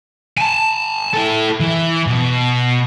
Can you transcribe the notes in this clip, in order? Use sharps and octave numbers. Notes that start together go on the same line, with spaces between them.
G#5 A5
E4 A4
E3
B2